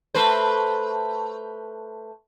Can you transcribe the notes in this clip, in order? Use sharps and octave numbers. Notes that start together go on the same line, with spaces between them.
A3 B4 C5